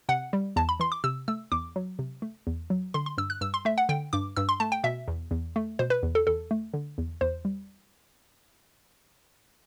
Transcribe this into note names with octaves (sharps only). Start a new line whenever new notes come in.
C3 F#5
G3
E2 A5
B5
E3 C6
D6
C3 E6
A3 E6
E2 D6
F#3
C3
A3
E2
F#3
D3 C6
C6
G2 E6
F#6
G2 E6
C6
A3 E5
F#5
D3 G5
G2 D6
G2 E6
C6
A3 A5
G5
B2 E5
E2
E2
A3
B2 C5
B4
E2
A4
E2 A4
A3
D3
E2
E2 C5
G3